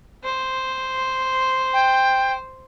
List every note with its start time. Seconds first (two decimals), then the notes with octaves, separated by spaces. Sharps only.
0.24 C5
1.73 G5